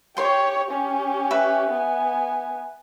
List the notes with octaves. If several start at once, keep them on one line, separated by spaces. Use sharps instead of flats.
G4 C#5 G5 C6
C#4 G4
B4 E5
B3 G#5